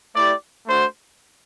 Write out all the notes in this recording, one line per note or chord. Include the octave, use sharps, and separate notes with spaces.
A3 E4 G4 D5
A3 D4 F#4 C5